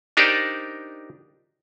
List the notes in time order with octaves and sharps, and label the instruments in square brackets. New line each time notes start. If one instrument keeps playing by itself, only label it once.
[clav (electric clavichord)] D4 D#4 G4 A#4 C5 D5